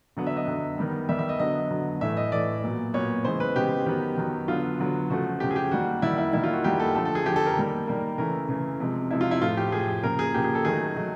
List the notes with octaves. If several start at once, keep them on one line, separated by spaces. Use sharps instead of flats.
D3 F#3 B3
E5
D#5
D3 F#3 B3
D#3 G3 B3
D#3 G3 B3 E5
E5
D#5
D3 F#3 B3 D#5
D3 F#3 B3
A2 E3 A3 E5
D#5
A2 E3 A3 D5
A#2 F#3 B3
A#2 F#3 B3 C#5
C#3 E3 G#3 B3 C5
B4
C#3 E3 G#3 B3 G4
D#3 F#3 B3 G4
D#3 F#3 B3
D3 F#3 B3 F4
D3 F#3 B3
C#3 F3 A3 F#4
C#3 F3 A3 G4
G#4
G4
D#3 G3 A#3 F#4
D#3 G3 A#3 E4
E4
D#3 G3 A#3 E4
F4
F#4
D#3 G3 A#3 G4
A4
D3 F3 A3 A4
A4
G#4
D3 F3 A3 G4
A4
A#4
D#3 G3 A#3
D#3 G3 A#3
C#3 E3 A3 A#4
C#3 E3 A3
C3 F3 G#3
C3 F3 G#3 E4
F4
E4
A2 F3 A3 F4
G4
A2 F3 A3 G#4
C#3 F3 A#3 A#4
G#4
C#3 F3 A#3 G4
G#4
A4
D#3 F#3 A3 G#4
D#3 F#3 A3